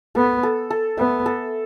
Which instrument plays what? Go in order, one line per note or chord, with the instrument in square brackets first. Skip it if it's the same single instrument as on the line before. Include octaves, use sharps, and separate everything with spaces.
[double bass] B3 [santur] A4
[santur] A4
A4
[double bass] B3 [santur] E5
[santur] A4